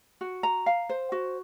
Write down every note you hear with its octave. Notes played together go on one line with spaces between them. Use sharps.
F#4
A#5
F5
C5
F#4